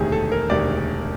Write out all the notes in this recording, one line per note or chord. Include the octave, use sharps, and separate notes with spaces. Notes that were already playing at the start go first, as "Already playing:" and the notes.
Already playing: E1 D2 C3 D#3 G#4
A4
A#4
E1 D2 C3 D#3 D5